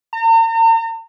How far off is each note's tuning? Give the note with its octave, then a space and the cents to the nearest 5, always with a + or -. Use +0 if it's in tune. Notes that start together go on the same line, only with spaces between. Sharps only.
A#5 -45